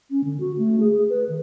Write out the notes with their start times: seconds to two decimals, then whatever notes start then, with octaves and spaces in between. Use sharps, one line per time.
0.11 C#4
0.24 D3
0.40 F#4
0.57 A3
0.80 G#4
0.92 G#4
1.10 B4
1.29 D#3